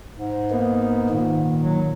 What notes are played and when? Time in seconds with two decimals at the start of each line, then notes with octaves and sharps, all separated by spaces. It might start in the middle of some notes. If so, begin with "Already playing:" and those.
0.17 G#2
0.51 A#3 B3 D#4
1.10 A#2 D#3
1.62 F#3